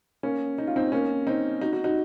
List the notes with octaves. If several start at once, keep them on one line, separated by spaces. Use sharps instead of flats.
A#3 C#4
D#4
F4
C4 D#4
A#3 C#4
C4 D#4
D#4 F#4
D#4 F#4
D#4 F#4